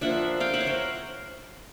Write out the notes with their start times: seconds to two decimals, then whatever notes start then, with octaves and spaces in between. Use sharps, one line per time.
0.01 F3 A#3 D4 E5 F#5
0.40 F5 G5
0.54 E5 F#5
0.61 C#5
0.66 A#4 C5